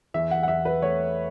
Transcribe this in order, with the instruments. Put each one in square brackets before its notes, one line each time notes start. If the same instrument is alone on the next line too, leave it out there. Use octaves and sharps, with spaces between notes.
[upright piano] E2 E5
F#5
F#5
E2 E5
B4
A3 C#5